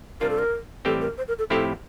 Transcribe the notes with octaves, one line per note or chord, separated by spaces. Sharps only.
C3 G3 D4 F4 A#4
A4
A#4
A2 E3 G3 C4 G4 A4
A#4
C5
A#4
A4
A2 F3 C4 E4 G4 A4